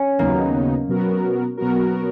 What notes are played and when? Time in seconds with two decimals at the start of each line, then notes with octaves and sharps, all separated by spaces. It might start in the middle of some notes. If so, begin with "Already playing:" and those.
Already playing: C#4
0.19 D#2 C#3 F#3 A#3 B3 D#4
0.88 B2 F#3 B3 F#4 A#4
1.57 B2 F#3 B3 F#4 A#4